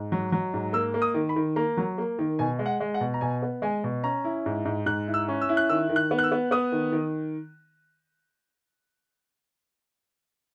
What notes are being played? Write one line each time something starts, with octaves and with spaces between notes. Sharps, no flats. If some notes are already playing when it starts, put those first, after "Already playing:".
Already playing: G#2
F#3
F#3
G#2
A#3 E6
A#3
D#6
D#3
B5
D#3
A#3 A#5
F#3
A#3
D#3
B2 G#5
G#3
F#5
G#3
F#5
B2
A#5
B2 G#5
B3
G#3 G#5
B2
C#4 A#5
E4
G#2
G#2
G#2 F#6
E4
E6
C#4
E6
E4
F#6
D#3 E6
D#3
F#6
B3
F#6
E6
B3
B3 D#6
D#3
D#3